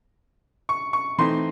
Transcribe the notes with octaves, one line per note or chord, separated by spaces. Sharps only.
C#6
C#6
E3 A3 C4 D#4 C6